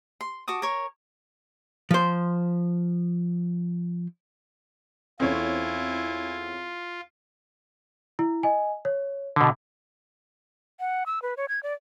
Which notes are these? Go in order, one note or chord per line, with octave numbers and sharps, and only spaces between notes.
C6
F#4 A5 D6 D#6
A#4 C#5
F3 C5
E2 C4 C#4 E4 F4 A4 C#5 G#5
E4
D#5 G#5
C#5
B2 D3
F#5
E6
B4
C#5
G#6
D5